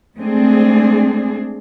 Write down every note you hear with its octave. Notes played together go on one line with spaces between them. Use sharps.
G#3 A3 C4 D4 G#4